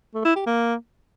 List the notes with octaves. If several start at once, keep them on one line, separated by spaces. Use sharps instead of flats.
A3
E4
G4
A#3